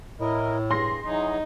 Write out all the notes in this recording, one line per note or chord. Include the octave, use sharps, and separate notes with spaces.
A2 E4 A#4 D#5
G2 G#4 C6 A#6
E3 F#3 D#4 G#4